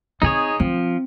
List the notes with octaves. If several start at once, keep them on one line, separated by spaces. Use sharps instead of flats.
C4 D#4 G#4 C#5
F3 C4